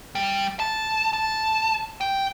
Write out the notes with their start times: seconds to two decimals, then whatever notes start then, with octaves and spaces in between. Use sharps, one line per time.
0.15 G3
0.60 A5
1.13 A5
2.01 G5